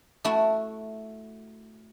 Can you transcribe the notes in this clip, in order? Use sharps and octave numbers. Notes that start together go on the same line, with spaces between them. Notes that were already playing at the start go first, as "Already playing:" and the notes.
A3 E4 F#4